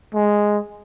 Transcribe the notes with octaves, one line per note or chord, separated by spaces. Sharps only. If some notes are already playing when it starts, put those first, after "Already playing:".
G#3